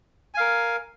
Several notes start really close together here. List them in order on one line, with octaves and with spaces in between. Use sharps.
G#5 F5 A#4